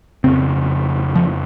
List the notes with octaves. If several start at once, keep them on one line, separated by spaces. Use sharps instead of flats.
F2 C#3 C4
F3